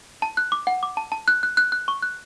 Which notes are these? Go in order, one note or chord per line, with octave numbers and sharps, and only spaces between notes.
A5
F#6
D6
F#5
D6
A5
A5
F#6
F#6
F#6
F#6
C#6
F#6